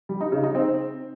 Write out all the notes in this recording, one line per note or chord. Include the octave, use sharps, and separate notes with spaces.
G3
D#4
C#3
D#4
C4